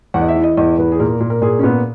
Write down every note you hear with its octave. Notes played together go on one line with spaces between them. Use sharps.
E2 F#5
D#5
E5
E3
D#5
E2 D#5
E2 B4
G#4
A#2 A#4
A#2
A#4
A#2 G#4
C#4
A#2 B3